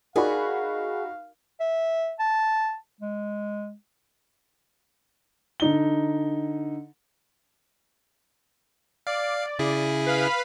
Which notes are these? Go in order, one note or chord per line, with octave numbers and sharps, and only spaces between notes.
D#4 F#4 G#4 A#4 D5 F5 B5
E5
A5
G#3
D3 D#4 G7
D5 F5
C#3 E4 G#4
B4 F5 B5